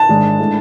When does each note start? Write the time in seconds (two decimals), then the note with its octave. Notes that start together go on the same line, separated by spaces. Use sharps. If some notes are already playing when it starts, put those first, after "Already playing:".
Already playing: A5
0.09 G#1 G#2 G#3 D4
0.39 A2 G#3 D4